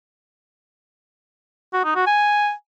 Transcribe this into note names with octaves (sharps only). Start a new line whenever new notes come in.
F#4
D#4
F#4
G#5